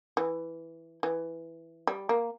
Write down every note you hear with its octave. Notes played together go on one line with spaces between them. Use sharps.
E3
E3
G3
A#3